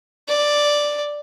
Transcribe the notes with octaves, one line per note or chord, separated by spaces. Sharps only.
D5